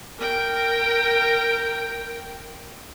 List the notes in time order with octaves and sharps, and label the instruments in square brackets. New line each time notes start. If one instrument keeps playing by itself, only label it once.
[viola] A#4 G5